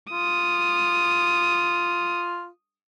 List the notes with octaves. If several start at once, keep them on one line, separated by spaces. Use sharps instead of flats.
F4 D#6